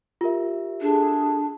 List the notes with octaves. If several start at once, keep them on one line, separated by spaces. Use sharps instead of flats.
F4 G4 A#4 E5
D4 G#4 A4